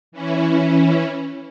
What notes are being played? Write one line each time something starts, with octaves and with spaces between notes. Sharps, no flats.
E3 C#4 E4